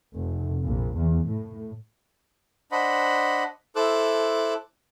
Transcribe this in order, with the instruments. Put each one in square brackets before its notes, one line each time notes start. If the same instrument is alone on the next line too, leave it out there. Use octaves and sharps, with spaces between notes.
[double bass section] F1
A#1
E2
A2
[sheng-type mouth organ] D4 C5 D#5 F#5 B5
E4 A4 C5 D6 E6 F#6